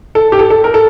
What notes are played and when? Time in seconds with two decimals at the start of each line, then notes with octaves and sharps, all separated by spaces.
0.15 A4
0.32 G4
0.39 A4
0.50 A4
0.64 A#4
0.74 A4